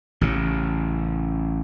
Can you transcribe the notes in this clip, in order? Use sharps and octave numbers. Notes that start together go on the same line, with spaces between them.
A1 C#3